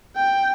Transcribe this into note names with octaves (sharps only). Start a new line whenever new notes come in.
G5